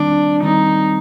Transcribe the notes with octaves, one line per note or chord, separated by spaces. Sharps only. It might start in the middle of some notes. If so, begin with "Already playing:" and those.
Already playing: D#3 G3 C4 D4
D#3 G3 C4 D#4